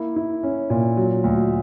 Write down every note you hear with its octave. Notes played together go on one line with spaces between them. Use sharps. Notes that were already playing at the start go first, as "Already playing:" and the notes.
Already playing: A#3 E4
E4
C#4
A#2
F#3
D2